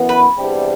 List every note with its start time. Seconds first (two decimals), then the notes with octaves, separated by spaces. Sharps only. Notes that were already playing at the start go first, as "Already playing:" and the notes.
Already playing: F#2 E3 B3
0.09 B4
0.38 E2 C3 G3 D4 G4